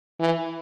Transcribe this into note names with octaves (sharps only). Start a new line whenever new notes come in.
E3